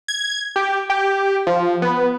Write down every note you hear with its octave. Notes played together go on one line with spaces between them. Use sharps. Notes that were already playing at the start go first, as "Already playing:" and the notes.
G#6
G4
G4
F3
B3